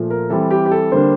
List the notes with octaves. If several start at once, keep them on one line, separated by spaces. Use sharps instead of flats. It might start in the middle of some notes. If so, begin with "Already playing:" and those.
Already playing: A#2 F3 A3
A#4
E3 G3 C4 A4
G4
G4
A4
D3 G3 A#3 D4 C5